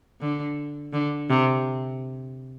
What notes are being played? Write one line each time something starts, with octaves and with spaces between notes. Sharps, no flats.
D3
D3
C3